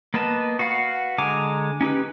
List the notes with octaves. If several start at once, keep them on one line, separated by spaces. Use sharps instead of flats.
A#3 B3 B4 D#5 A5
F#4 B4 F5 F#5
D3 G#3 G#5 A#5 D6
C#4 D#4 G4 B4